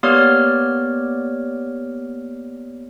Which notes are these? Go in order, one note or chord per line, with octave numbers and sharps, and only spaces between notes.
A#3 B3 G4 C#5 D5 F6